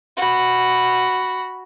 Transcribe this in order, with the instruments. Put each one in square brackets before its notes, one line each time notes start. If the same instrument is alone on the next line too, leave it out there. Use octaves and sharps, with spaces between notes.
[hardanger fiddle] F#4 B5